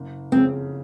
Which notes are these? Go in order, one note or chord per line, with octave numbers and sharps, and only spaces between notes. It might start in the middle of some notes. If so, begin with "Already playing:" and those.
Already playing: F#1
F2 C#3 C4